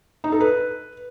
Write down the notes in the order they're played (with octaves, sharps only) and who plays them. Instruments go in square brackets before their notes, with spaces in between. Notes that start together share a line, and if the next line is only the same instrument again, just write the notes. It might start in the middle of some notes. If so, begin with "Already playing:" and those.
[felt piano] D#4
A4
B4